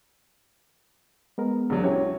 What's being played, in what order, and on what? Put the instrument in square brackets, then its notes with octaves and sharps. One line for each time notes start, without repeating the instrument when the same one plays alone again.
[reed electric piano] G#3 B3 A#4
[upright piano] A#1 E2 F#3
[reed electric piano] C#4 E4 G4 [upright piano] F#4 C#5